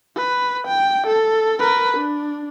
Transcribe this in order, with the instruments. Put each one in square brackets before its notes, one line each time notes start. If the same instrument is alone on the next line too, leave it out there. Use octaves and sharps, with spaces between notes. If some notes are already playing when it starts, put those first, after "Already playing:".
[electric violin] B4
G5
A4
A#4 B4
D4